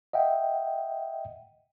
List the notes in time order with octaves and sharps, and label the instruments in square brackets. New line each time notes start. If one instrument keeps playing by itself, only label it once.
[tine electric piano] D#5 E5 F#5 G5